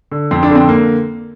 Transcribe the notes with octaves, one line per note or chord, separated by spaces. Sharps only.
D3
F2 C4
D4
D3 C4
A#3